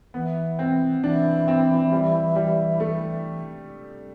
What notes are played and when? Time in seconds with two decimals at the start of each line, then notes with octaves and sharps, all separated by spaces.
0.14 E3 B3
0.59 C4
1.03 E3 D4
1.48 C4
1.92 G3
2.36 G3
2.80 A3